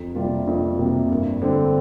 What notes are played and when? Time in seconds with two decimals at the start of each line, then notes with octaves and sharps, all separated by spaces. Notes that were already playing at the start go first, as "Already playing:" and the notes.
Already playing: F2
0.15 C3 G3 A#3 F4
0.47 F2
0.79 C3 G3 A#3
1.11 G2
1.42 D3 G3 C4